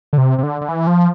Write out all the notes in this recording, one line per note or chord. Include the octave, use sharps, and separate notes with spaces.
D3
C3
C3
D3
D3
E3
F3